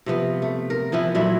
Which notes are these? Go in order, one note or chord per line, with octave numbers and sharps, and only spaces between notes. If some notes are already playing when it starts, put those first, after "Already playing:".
C3 F3 B3
A3
A#4
E3 F3 B3 E4
A#2 F#3 A3 E4